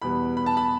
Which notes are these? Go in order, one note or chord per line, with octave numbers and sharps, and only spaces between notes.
E2 B2 G3 B3 B5
B5
A5
B5